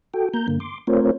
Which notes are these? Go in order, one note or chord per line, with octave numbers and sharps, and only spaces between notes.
F#4 A4 G5
A#3 A#5 G6
G2 D3 A#3
C6 D6
A3 C4 F4 A#4 C5 C#5